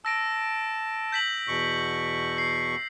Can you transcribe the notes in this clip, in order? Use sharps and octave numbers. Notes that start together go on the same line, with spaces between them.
A5 E6 A#6 D7
G6 B6 F#7
E2 B2 C#6
C7